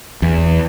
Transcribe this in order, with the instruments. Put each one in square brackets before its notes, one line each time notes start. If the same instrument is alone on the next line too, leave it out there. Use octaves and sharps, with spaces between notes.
[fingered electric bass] E2